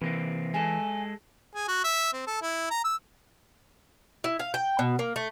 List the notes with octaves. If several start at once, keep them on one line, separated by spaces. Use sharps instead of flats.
C3 E3 A#3 C4
G#3 A4 G#5
G#4
F#4
E5
C4
A4
E4
A#5
E6
E4
F5
G5
B2
A#3
A3